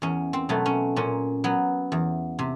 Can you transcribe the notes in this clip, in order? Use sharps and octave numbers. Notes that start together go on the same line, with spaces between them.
E2 C#4
C4
B2 F#3 A3
C#4
A#2 C#4
F#3 B3
E2
C3